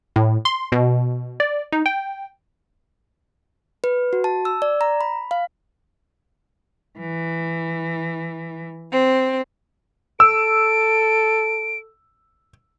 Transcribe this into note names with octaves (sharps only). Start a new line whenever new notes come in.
A2
C6
B2
D5
D#4
G5
B4
F#4
A5
E6
D5
A#5
B5
F5
E3
C4
A4 E6 D7